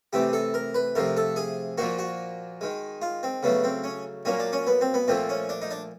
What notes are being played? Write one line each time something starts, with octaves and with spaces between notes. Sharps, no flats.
C3 E3 A3 G4
A4
A#4
B4
C3 F3 A3 A#4
A4
G#4
A#2 F3 A#3 F#4
F#4
D#3 G#3
F4
C4
C#3 F#3 A3 B3
C4
C#4
A#2 F#3 A#3 C#4
D4
C#4
B3
C4
B3
A#2 F3 A3 C4
C#4
D4
D#4
D4